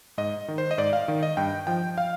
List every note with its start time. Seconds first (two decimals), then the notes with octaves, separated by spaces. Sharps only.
0.18 G#2 D#5
0.48 D#3
0.58 C5
0.71 D#5
0.78 G#2 D5
0.93 F5
1.08 D#3
1.23 D#5
1.37 G2 G5
1.67 F3 G5
1.98 F5